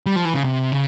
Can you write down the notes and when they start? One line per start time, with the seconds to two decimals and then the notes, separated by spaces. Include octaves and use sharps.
0.06 G3
0.16 F3
0.25 E3
0.34 C#3
0.44 C3
0.72 C#3